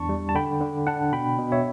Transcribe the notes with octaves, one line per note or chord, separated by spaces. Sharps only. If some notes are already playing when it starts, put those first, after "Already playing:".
Already playing: E2 D4 A5 C#6
G3
A5
D3 G5 B5
D3
D4 F#5 A5
B2 G5 B5
B2
C#5 E5